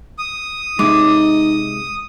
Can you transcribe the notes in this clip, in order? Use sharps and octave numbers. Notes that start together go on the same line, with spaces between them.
D#6
C3 G#3 D#4 D6